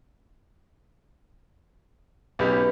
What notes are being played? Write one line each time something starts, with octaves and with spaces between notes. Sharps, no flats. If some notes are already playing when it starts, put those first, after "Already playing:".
B1 C#4 G4 B4